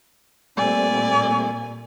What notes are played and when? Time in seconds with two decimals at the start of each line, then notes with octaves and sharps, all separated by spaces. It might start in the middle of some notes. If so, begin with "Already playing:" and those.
0.57 A#2 G3 A3 C4 D5 G#5